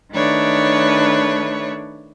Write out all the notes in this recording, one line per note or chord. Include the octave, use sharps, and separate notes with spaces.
D#3 A3 D4 B4 C#5 D5